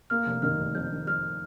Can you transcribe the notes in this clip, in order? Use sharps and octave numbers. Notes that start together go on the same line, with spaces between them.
A#3 F6
F1
D#3 F6
F1
F2 G6
D#3
F2 F6